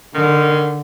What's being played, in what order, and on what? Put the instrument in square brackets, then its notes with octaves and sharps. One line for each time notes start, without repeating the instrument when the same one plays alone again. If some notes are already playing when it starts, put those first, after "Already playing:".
[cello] D3 [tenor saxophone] D#3